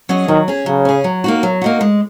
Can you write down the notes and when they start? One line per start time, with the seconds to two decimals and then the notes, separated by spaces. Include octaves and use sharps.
0.09 F#3 C#4 G#4 D#5
0.28 D#3 F#3
0.48 C#4 G#4
0.66 C#3 F#3
0.85 C#4 G#4
1.04 F#3
1.24 A#3 D#4 F#4
1.43 F#3
1.61 A#3 D#4 F#4
1.81 G#3